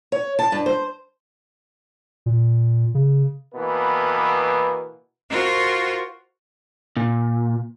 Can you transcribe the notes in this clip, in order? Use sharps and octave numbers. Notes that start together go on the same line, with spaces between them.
C#5
A5
G2
C5
A#2
C#3
B2 E3 A#3 B3
F4 F#4 A#4 C5
A#2